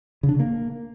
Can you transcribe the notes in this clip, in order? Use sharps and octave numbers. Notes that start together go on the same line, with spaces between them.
C#3
D4
C#3
A#3